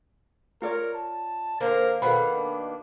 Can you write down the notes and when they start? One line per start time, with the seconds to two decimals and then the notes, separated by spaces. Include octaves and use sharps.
0.62 F4 A#4 C#5 D5
0.94 A5
1.60 D3 A#3 A#4 C5
2.02 B2 D#3 A#3 A4 F#5 B5
2.37 D4